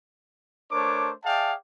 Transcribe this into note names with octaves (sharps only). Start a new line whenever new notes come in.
A3 D4 A#4 C5 C#5 D6
G#4 D5 E5 F5 G5 A5